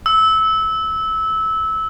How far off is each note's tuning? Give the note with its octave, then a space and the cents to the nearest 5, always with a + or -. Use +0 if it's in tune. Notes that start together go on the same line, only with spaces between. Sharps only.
E6 -20